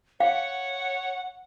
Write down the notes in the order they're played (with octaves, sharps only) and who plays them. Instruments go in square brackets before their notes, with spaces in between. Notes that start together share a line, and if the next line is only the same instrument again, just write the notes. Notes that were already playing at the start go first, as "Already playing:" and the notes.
[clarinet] C#5 [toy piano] F5 [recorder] F#5